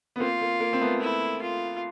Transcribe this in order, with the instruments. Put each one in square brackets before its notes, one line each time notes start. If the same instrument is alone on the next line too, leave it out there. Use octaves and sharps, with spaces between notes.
[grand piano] B3
[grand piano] A#3 C4 [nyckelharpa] F4
[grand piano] A#3
A#3
C4
A3 B3
[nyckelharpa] E4
F4